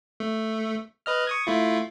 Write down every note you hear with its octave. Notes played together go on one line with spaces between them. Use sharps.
A3
B4 D#5 F6
C#6 D#6 G#6
A3 E4 F4